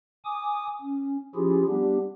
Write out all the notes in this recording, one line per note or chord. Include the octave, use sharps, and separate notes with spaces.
G#5 D6 D#6
C#4
F3 C#4 E4 F4 G4 G#4
G3 B3 D4 G4